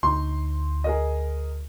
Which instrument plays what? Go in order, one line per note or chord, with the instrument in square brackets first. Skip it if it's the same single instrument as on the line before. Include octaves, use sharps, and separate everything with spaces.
[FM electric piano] D2 [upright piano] D#4 C6
[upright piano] G#4 A#4 D#5